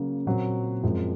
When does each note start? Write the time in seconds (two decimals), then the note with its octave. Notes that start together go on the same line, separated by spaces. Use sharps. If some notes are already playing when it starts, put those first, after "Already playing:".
Already playing: C#3 F#3 A#3
0.26 A#2 F#3 C4 F#4
0.83 F#2 F3 G#3 C4 F4